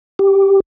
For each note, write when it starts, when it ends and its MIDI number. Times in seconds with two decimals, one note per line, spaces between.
0.19 0.60 67